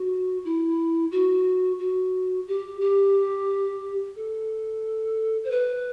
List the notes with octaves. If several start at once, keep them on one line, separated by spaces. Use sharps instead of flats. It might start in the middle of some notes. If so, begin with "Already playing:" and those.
Already playing: F#4
E4
F#4
F#4
G4
G4
A4
C5
B4